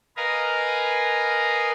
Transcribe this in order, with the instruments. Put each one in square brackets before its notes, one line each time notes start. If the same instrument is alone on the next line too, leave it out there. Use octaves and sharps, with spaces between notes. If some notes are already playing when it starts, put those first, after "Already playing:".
[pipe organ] A#4 B4 D#5 F5 G#5 A#5